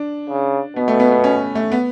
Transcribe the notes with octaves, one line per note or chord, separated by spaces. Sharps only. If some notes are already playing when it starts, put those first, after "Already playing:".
Already playing: D4
C#3
B2 B3
A3
B3
B3
C#4
A3
B3